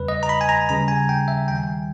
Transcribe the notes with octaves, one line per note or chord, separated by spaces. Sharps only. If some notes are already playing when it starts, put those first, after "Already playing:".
Already playing: E2 C#3 G3 B4
D#5
A#5
B5
G#5
A#5
D#2 C#3 G3 A#5
G#5
G5
E5
D#2 D#3 G3 G5
G#5
G5